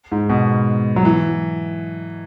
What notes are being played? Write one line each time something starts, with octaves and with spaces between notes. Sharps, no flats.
G#2
B2
F#3
E3